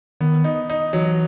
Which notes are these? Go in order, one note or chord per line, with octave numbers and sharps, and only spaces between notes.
D#3 B3
D#4
D#4
E3 F#3